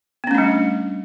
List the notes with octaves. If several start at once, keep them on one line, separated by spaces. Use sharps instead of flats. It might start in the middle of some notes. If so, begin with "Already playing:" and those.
G3 A3 B3 C#4 D4